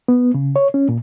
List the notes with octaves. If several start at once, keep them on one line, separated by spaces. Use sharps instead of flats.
B3
C#3
C#5
C#4
A#2